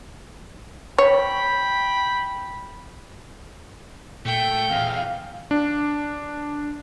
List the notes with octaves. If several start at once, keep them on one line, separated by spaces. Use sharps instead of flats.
C#5 G5 B5
A#2 A3 G5
E2 F5
D4